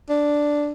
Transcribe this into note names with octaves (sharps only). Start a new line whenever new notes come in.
D4